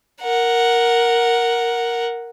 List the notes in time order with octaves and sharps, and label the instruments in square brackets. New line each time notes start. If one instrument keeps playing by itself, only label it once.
[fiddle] A#4 F#5